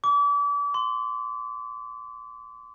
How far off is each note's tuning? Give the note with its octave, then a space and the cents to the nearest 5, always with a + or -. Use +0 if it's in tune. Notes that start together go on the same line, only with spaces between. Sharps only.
D6 -35
C6 -20